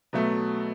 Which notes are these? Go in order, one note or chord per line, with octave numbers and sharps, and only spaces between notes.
B2 F#3 A3 E5